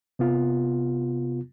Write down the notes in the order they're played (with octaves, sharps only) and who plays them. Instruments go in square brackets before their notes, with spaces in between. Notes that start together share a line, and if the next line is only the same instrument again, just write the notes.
[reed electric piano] C3 B3 F4